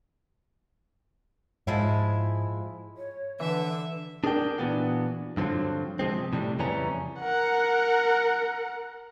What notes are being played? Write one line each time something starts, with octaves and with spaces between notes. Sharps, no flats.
G#2 F3 G#3 E4
C#5
D3 E3 B4 E5
D4 G#4 A#4 D5 G5
A#2 E3 B3 D4 F#4
G2 D3 F3 F#3 C4
C3 F3 G#3 C4
A2 C3 G3
F2 C#3 E3 G3 C#4 A#5
A#4 F#5